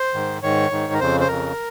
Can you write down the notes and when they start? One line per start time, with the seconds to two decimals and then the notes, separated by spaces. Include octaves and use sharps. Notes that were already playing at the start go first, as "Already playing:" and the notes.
Already playing: C5
0.14 G#2 D#3
0.43 G#2 D#3 C#5
0.71 G#2 D#3
0.93 A#4
1.00 F2 C#3 C5
1.20 C5
1.28 F2 C#3 A#4